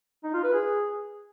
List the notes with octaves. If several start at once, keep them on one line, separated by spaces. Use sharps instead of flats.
D#4
F4
B4
G#4